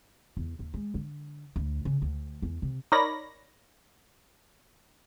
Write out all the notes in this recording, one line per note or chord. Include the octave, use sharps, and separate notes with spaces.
E2
D#2
G#3
D3
D2
C#3
D2
E2
C3
D#4 A#4 C#5 D5 B5 A#6